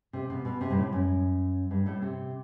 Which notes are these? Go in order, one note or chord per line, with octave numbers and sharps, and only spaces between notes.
C3
B2
B2
C3
G2
A2
F#2
G2
A2
C3